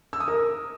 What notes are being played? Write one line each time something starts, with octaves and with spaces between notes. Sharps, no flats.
E6
D#6
A#4